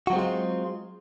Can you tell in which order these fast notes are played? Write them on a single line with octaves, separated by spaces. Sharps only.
F#4 F#3 C4 G#3 F4